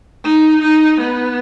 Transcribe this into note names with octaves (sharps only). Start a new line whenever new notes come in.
D#4
D#4
B3